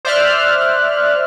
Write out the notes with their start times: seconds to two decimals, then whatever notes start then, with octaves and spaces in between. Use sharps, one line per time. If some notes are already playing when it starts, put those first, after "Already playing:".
0.05 C5 D5 E5 F6 F#6